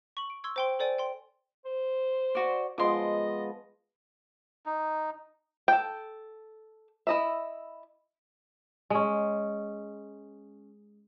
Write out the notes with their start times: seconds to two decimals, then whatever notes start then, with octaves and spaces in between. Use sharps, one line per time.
0.17 C#6 F#7
0.30 D7
0.44 C6 C#6 E6 G#6
0.56 C5 G5 C6
0.79 A4 C5 D5 G5 G#5
0.99 G5 C6
1.66 C5
2.35 F#4 D5
2.78 F3 G#3 B3 D#5 C6 D6
4.66 D#4
5.68 A4 G5
7.07 E4 D#5 E5
8.90 G#3 C#4